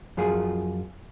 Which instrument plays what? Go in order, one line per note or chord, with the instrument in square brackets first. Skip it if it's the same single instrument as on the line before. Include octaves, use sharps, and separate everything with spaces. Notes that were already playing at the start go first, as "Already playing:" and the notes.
[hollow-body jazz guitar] F#2 F3 F4 G#4